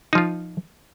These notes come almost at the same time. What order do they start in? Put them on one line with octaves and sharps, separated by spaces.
D#4 F3 F4